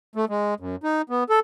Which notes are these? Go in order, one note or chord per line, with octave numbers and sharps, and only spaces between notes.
A3
G#3
F#2
D#4
B3
A4